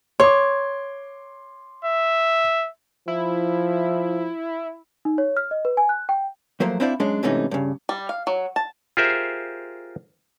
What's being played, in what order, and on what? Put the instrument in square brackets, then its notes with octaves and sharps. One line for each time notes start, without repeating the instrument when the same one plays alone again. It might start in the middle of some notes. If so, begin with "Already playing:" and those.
[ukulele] C#5 [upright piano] C6 D6
[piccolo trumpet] E5
[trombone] F3 [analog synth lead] E4
[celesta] D#4
C#5
F6
D#5
B4
G#5
F#6
G5
[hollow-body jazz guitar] F3 F#3 A3 A#3 C5
C4 D4 E4 C5 D5 F5
F#2 G#3 C#4 D4
G#2 C3 E3 A3 C#4 D#4
G2 C#3
[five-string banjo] G3
F5
F#3
A5
[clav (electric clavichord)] F4 G4 G#4 A#4 C5 E5